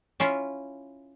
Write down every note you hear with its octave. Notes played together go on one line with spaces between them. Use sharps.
C#4 E4 F4